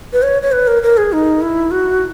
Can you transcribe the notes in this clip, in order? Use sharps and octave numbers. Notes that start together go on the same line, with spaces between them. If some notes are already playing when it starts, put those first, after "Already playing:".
B4
C#5
C#5
B4
A#4
A#4
G#4
D#4
E4
F#4